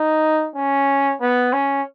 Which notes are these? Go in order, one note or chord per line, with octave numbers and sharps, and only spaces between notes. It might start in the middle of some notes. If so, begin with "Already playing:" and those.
Already playing: D#4
C#4
B3
C#4